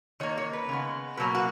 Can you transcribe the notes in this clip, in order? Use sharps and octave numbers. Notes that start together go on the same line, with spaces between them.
D#3 A#3 C#5
C#5
B4
C#3 G#3 B3
B2 F#3 A#3 B4
F#4